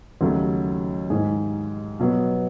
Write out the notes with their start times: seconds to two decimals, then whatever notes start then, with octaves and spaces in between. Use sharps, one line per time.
0.21 D#2 C#3 F#3 A3
1.10 G#2 D#3 G#3 G#4
1.99 B2 F#3 B3